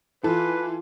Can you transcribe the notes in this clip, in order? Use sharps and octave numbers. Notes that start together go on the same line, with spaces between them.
E3 F4 A4 B4